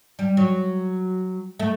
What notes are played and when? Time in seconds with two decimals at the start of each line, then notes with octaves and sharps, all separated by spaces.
0.19 G3
0.37 F#3
1.60 A3